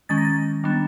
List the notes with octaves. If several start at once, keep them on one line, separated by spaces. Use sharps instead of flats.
D#3 G#3 C#4 A6
A#6
A6
D#3 G3 B3 D4